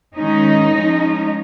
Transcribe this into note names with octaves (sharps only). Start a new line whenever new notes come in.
D#3 G#3 C#4 D#4
F3 G#3 C#4